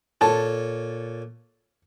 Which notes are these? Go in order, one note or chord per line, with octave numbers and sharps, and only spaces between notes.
A#2 A4 C#5 A5